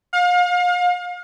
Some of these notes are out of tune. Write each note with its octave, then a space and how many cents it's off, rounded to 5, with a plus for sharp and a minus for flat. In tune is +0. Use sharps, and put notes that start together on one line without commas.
F5 +35